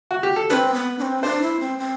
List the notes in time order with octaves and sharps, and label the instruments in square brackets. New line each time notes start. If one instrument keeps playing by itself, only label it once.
[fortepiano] F#4
G4
A4
[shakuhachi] C4 D4 [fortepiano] B4
[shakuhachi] B3
D4
C4
[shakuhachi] D4 [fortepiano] C5
[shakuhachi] E4
C4
C4